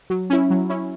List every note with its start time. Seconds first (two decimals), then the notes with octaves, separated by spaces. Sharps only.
0.10 F#3
0.30 C#4 E4
0.50 F#3
0.69 C#4 E4